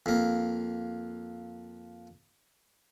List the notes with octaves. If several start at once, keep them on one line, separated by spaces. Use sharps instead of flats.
F2 A#3